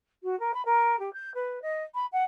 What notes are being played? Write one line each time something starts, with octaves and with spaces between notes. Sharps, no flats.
F#4
A#4
B5
A#4
G4
G6
B4
D#5
B5
F#5